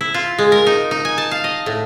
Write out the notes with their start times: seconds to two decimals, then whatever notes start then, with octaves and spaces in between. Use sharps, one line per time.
0.01 E4
0.14 F4
0.38 G#3
0.52 A#4
0.66 D#4
0.91 D#4
1.05 G#5
1.18 A5
1.31 F5
1.44 D#5
1.66 A2